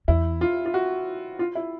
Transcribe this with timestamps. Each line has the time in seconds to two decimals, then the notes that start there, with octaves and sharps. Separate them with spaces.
0.08 E2 E4
0.41 F4
0.66 F4
0.74 F#4
1.39 F4
1.55 E4